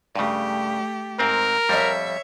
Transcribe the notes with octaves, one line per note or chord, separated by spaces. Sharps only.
G2 C#3 A3 G4
G#2 C4 A#4
F2 G3 C#5 E5